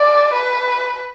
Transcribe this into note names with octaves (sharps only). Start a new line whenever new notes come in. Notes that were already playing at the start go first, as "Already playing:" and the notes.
Already playing: D5
B4